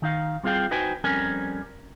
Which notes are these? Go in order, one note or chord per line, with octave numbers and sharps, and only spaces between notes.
D#3 D#4 F5
G3 C4 F4 G#4 F5 G5
D#4 F#4 B4 C5 G5 G#5
F2 G3 C4 C#4 A#4 G#5